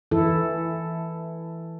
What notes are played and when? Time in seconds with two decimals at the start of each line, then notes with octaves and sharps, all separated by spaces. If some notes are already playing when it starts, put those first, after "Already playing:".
0.11 E3 E4 A4